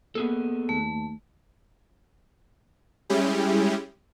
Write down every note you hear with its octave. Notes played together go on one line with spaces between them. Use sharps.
A#3 B3 G#4 A4
D#2 A3
G3 G#3 C#4 E4 G4 G#4